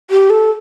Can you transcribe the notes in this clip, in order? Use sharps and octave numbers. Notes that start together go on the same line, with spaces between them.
G4
A4